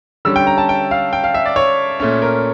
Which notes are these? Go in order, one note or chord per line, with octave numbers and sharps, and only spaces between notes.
D3 G3 C#4 E6
G5
A#5
A5
G5
F5
G5
F5
E5
D5
C#5
A#2 A3 C#4
A#4